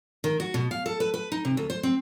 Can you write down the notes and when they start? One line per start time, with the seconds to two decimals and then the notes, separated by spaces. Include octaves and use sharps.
0.24 D#3
0.40 F#4
0.54 B2
0.71 F5
0.86 A4
1.00 B4
1.14 B4
1.32 D#4
1.45 C3
1.57 D2
1.70 C5
1.83 C4